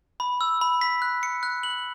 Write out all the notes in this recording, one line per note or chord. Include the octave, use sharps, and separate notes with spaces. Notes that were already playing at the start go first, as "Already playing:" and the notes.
B5
E6
B5
B6
F#6
C#7
F#6
F#7